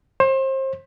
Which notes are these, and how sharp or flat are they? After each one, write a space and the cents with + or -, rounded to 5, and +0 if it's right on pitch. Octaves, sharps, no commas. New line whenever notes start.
C5 +30